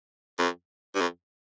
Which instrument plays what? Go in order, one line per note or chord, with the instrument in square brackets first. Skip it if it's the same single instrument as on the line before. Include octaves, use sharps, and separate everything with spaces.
[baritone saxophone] F2
G2
F2